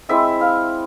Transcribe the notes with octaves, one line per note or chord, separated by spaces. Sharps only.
G#3 C4 E4 E5
F5